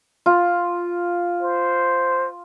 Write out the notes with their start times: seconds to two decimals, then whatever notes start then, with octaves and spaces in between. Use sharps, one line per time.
0.26 F4
1.42 C5